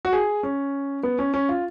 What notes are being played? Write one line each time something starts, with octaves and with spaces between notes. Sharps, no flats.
F#4
G#4
C#4
B3
C#4
C#4
F4